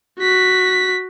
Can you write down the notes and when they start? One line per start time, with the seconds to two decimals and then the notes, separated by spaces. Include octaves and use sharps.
0.19 F#4 B6